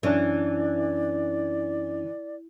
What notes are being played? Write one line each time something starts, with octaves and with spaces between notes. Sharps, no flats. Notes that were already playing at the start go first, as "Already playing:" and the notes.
F#2 E3 C#4 D4 D5